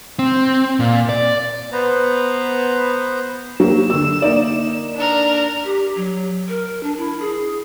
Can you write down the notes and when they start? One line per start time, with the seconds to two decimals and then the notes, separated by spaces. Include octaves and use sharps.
0.19 C4
0.80 A#2
1.09 D5
1.72 B3 B4 C5 A#5
3.60 F#3 A#3 G4 E7
3.90 D3 E6
4.22 A#3 D#4 D5
4.96 D4 A#4
5.65 G4
5.96 F#3
6.49 A#4
6.83 D4
6.98 E4
7.20 G#4